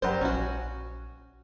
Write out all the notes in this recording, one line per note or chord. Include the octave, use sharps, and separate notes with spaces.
F#1 F#3 G3 C5
A#1 C#4 F#4